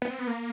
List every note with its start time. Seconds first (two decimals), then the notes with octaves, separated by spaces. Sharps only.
0.02 B3
0.10 C4
0.19 B3
0.27 A#3